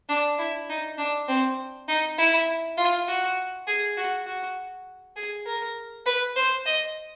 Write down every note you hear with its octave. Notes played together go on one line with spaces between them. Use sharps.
D4
E4
D#4
D4
C4
D#4
E4
F4
F#4
G#4
F#4
F#4
G#4
A#4
B4
C5
D#5